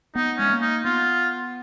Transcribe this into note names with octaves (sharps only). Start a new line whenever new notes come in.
B3 D#4
G#3 C#4
A#3
D#4
B3 F4